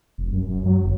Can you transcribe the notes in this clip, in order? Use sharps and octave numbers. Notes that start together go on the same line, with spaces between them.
F1
F#2
F#2
F#3
G1